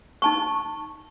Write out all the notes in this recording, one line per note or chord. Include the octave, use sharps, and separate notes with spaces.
D#4 A5 C#6